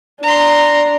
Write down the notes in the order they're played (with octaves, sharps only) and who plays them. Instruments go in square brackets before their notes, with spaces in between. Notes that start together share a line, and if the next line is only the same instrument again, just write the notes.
[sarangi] D4 [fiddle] A#5 C6